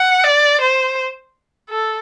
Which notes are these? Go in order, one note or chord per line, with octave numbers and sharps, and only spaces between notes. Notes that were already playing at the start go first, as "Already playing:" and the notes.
Already playing: F#5
D5
C5
A4